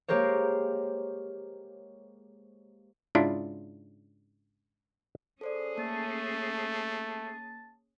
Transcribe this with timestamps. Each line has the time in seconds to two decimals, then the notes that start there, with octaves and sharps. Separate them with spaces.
0.08 G#3 A#3 G4 A#4 C5 C#5
3.15 G#2 C#3 D4 E4 F4
5.41 C#4 G#4 A4 C5 D5
5.78 A3 A#3 A5